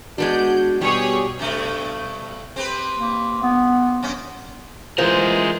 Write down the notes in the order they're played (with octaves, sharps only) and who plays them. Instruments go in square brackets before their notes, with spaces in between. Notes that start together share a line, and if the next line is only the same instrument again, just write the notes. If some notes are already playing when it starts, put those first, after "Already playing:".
[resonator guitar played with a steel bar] G#3 B3 D4 [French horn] F#4 [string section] G6
[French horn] B2 [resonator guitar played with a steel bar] G3 [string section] G4 G#4 C#5
[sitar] G2 B2 A3
C4 G4 B4
[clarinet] A#3
B3
[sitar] F#2 C#4
[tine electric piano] E3 F4 [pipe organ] G#3 [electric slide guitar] A#4 D#5 E5 [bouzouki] C5